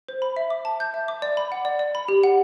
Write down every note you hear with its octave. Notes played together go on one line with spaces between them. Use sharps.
C5
B5
E5
D6
A5
G6
E5
D6
D5
B5
F#5
D5
D5
B5
G4
F#5